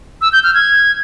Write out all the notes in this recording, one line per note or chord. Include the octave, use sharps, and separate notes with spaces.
E6
G6
F6
G#6